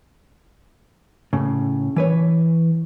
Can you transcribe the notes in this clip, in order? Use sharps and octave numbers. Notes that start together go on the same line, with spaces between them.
A2 C#3
E3 B4 C#5